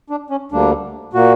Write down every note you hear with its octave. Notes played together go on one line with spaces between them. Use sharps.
D4
C#4
D2 D3 G3 A#3 D4
A#2 A#3 F#4